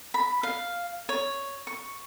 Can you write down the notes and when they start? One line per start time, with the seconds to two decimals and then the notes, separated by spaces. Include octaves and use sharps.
0.14 B5
0.43 F5
1.09 C#5
1.67 C#6